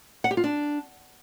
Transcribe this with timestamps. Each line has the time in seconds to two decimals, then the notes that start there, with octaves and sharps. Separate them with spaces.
0.24 F#5
0.31 G4
0.37 F4
0.44 D4